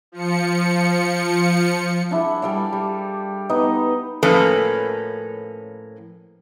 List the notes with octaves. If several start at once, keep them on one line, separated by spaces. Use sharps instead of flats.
F3 C#7
D4 E4 G#4 F#5
G3 A4 D5 F5
G3
B3 D#4 B4 D#5
A2 F3 A#3 C#4 A4 B4